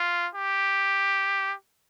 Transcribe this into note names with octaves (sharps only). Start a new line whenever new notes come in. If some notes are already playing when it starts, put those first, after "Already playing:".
Already playing: F4
G4